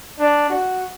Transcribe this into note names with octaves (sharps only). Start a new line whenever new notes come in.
D4
F#4